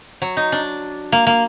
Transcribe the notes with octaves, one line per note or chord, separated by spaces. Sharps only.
F#3
D#4
D4
A#3
A#3